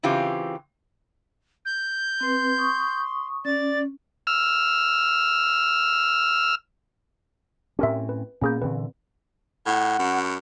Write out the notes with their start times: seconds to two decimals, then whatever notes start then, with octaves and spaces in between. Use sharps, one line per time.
0.03 C#3 E3 C4 F4 G4
1.65 G6
2.21 C4 B4 C6
2.58 C#6 D#6
3.45 C#4 D5 A6
4.27 E6 F6
7.79 A2 C4 C#4 G4 A#4 E5
8.09 B4
8.42 A#2 A#3 B3 C#4 G#4 G6
8.62 A#2 D3 E3 C4 B4
9.66 A2 F#5
9.99 F#2